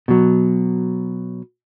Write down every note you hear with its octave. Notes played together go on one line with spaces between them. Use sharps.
B2 F#3